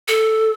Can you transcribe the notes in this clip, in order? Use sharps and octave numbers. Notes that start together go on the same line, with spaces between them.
A4